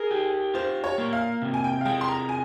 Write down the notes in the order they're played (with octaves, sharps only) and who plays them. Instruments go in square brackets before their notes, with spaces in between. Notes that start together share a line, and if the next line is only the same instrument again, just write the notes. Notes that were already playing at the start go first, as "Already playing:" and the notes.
Already playing: [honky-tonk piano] G#4 [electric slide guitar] A#4
[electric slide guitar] G4
[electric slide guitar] F4 [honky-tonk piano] C5
[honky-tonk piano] C#5
[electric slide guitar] A#3
[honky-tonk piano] F5
[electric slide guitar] C3
[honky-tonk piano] G#5
G5
F5
[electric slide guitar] G#3 [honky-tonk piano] G5
[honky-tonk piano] C6
A#5
G#5